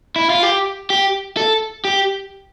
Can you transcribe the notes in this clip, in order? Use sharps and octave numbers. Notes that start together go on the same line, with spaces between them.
E4
F4
G4
G4
A4
G4